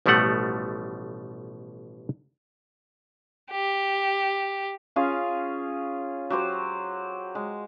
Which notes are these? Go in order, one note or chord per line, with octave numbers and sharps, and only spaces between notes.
A1 B2 F3 G3 A3 F#5
G4
C#4 F4 G#4 F5
F#3 G4 C5
G#3